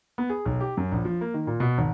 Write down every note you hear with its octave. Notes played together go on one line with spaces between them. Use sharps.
B3
G#4
B1
G4
F#2
A#1
F3
A#3
D#3
A#2
B2
G#1